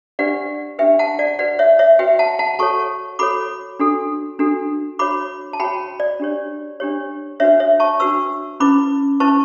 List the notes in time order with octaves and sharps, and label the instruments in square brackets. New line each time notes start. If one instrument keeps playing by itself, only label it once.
[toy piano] D4 G4 B4 D5 F#5
D4 G4 B4 E5 G5
F#5 A5
D5 F#5
F#4 B4 D5 F#5
C#5 E5
C#5 E5
F#4 B4 E5 G5
F#5 A5
F#5 A5
F#4 A4 C#5 A5 C#6
F#4 A4 C#5 B5 D6
D4 F#4 A4
D4 F#4 A4
F#4 C#5 B5 D6
A5
F#4 C#5 G5 B5
D5
D4 G4 C#5
D4 G4 C#5
D4 F#4 B4 C#5 E5
C#5 E5
A5 C#6
D4 F#4 B4 C#6 E6
C#4 E4 B4 B5 D6
C#4 E4 B4 A5 C#6